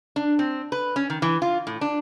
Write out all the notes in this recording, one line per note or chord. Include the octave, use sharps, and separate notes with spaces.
D4
C4
B4
C#4
D#3
E3
F4
A2
D4